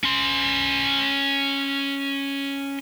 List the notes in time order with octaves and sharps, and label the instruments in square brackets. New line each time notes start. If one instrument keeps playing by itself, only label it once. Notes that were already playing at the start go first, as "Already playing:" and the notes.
[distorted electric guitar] C#4 C6